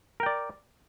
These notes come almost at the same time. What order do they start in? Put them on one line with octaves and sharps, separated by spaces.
A#4 G5 D5